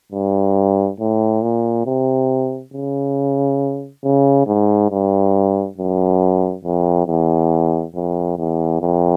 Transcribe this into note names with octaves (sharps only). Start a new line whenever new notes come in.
G2
A2
A#2
C3
C#3
C#3
G#2
G2
F#2
F2
E2
F2
E2
F2